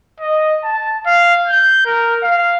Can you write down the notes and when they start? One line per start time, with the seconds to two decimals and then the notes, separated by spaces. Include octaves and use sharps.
0.20 D#5
0.64 A5
1.06 F5
1.48 G6
1.86 A#4
2.23 F5